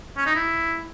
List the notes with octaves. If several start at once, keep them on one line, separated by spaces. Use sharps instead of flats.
C#4
D#4
E4